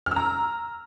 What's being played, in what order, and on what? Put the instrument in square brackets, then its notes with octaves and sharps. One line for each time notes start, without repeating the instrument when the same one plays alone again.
[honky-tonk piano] F6
E6
A#5